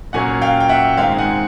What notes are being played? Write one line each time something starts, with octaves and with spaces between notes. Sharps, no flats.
A#2 F#3 A#3 C#4 F#5 G#5
F5 G5
G5
E5 F#5
G#2 D#3 G#3 C4 D#4 F5 G5
F#5 G#5